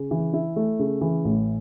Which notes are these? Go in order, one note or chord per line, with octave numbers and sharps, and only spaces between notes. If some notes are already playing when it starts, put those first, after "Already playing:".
Already playing: C#3
E3
E4
A3
C#3
E3
A1